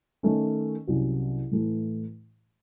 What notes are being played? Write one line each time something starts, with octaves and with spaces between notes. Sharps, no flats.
D#3 A3 C#4
C2 C3 F#3 C#4
A2 E3 A3